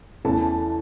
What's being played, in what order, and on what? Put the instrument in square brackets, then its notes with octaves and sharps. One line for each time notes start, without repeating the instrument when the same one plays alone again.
[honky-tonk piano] E2 E3 A3 C#4 A5